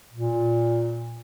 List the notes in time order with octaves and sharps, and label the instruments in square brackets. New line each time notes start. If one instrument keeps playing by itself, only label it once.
[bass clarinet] A#2